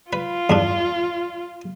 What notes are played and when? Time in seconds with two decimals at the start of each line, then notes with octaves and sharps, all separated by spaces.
0.13 F4 B4
0.50 E2 G2 D4